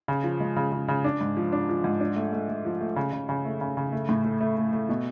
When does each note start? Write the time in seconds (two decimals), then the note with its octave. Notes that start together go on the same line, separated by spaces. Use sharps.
0.08 C#3
0.24 F3
0.40 G#3
0.56 C#3
0.72 C#3
0.88 C#3
1.04 D4
1.21 G#2
1.37 F3
1.53 D4
1.69 F3
1.84 G#2
2.00 D4
2.16 A3
2.33 A3
2.49 A3
2.65 F3
2.81 A3
2.96 C#3
3.12 C#3
3.29 C#3
3.45 A3
3.61 C#3
3.77 C#3
3.92 A3
4.09 A2
4.25 A3
4.41 A3
4.57 A3
4.73 A3
4.89 B2